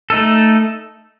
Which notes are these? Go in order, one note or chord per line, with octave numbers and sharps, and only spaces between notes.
A3 D#4 A4